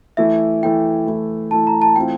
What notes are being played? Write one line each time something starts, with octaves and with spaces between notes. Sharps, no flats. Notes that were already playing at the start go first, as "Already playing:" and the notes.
E3 A3 E4 E5
E3 A3 E4 G5
E3 A3 E4
E3 A3 E4 A5
A#5
A5
E3 A3 C4 F4 G5